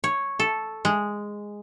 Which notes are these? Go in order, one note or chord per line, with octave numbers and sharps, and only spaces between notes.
C#5
A4
G#3